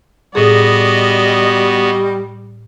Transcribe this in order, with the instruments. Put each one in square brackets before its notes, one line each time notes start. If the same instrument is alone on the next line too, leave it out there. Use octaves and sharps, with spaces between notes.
[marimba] A2 G#4 [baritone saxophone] G3 [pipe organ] B3 F#4 [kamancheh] D5 D#5